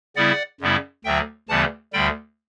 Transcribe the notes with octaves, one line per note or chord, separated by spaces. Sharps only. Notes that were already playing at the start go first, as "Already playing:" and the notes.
C#3 G3 B3 E4 D5 F#5
F#2 C#3 G3 B3 E4
D2 D3 F#3 E5 G5
D2 C#3 E3 G3 B3 F#5 A5
D2 D3 G3 G5 B5